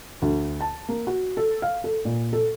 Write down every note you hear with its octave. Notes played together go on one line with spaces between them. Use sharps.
D2
A5
A#3
F#4
A4
F5
A4
A#2
A4